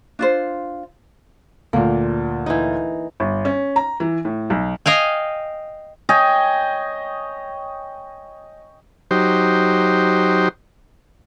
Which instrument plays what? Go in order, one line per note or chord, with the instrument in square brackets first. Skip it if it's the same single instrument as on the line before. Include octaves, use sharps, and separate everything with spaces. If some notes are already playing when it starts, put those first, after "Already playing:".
[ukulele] D4 F4 C5
[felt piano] D2 A#2 [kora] A#3
[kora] E3 D#4
[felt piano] G1
C#4
A#5
E3
A2
B1
[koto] D#5 F5 G5 G#5
[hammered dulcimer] C#5 D#5 G5 G#5
[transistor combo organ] F#3 D#4 G4 C5